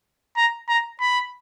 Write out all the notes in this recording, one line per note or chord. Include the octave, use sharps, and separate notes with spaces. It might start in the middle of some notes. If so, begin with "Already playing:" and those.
A#5
A#5
B5